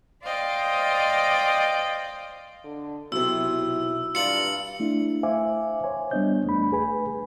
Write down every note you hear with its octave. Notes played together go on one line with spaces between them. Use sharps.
C5 D5 D#5 F5 G5
D3
B1 C3 E4 E6
G2 F4 A#4 D5 C#7 F#7
A3 D4 E4
C5 E5 F5 G#5 D6
C5 C#5 G#5
G3 B3 D4 D#5 G6
E2 A3 D4 B5
G#4 B4 G#5 B5